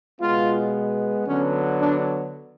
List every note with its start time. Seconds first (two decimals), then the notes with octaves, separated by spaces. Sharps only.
0.21 B2 G#3 B3 F4
1.27 D3 F#3 B3 C#4
1.80 D4